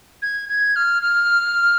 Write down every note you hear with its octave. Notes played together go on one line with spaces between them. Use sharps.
G#6
G#6
F6
F6